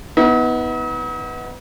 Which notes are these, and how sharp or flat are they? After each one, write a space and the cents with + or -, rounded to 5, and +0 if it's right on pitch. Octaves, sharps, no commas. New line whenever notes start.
B3 +0 D#4 +45